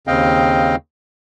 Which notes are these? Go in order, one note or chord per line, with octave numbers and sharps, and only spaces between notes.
D#2 C#3 C4 D#5 F5 G5